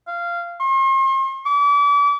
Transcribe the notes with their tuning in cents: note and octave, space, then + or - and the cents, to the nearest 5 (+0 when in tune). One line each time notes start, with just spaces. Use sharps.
F5 -15
C6 +45
D6 -35